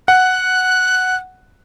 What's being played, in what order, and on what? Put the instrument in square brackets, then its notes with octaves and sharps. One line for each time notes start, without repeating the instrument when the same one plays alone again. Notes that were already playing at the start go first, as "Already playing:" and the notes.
[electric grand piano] F#5 [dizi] F#6